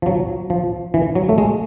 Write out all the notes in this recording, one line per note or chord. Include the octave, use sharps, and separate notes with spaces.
F3
F#3
F3
E3
F#3
A3
G#3